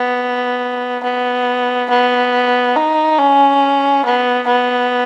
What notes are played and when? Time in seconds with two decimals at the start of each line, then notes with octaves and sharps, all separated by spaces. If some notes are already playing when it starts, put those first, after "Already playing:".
Already playing: B3
1.03 B3
1.89 B3
2.76 D#4
3.18 C#4
4.05 B3
4.47 B3